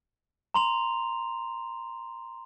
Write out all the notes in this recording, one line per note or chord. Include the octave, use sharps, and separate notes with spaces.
A#5 C6 F7